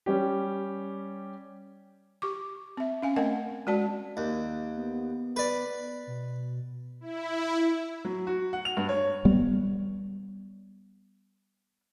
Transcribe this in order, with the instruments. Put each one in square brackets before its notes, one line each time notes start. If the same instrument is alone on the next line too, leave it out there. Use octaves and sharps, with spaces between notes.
[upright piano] G3 C#4 G4
[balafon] G4 C#6 D6
C4 E5
C#4 F5 G#5
A3 C4 A#4 D#5 F#5
G#3 F#4 D5 A5
[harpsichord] D#2
[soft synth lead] B3
[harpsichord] B4 D5
[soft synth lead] B2
[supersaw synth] E4
[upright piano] F#3
F#4
F#5
F7
G2
C#5
[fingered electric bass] G3 B3